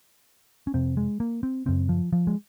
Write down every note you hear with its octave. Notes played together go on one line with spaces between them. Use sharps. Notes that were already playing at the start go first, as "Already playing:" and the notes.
C#4
F2 C3 C4
G#3
A#3
C4
F#2 C#3 C4
F3
F3
G#3